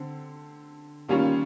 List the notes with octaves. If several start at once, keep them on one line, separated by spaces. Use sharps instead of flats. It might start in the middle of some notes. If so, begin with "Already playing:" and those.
Already playing: D3 C4
D#3 G3 A#3 C#4 F4